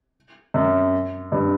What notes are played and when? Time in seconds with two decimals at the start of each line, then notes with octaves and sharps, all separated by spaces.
0.54 F#2
1.32 G2